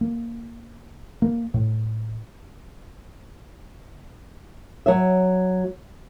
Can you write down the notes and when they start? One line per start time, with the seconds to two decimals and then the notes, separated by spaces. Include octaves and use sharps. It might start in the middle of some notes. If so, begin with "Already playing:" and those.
0.01 A#3
1.22 A#3
1.54 A2
4.86 F#3 C#5 E5